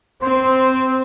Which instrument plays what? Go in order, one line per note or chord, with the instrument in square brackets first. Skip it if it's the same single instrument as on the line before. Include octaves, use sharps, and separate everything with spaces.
[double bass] C4 [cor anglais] C5